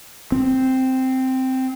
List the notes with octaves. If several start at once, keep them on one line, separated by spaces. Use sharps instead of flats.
C4